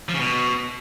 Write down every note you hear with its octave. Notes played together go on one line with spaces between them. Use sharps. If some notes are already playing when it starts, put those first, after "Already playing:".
F3
C#3
B2